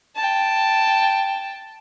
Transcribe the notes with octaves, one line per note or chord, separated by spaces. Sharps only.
G5 A5